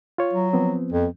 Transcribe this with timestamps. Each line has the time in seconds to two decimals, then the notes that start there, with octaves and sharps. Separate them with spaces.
0.18 F4 C#5
0.33 F#3
0.53 F3 B3 C4
0.93 F2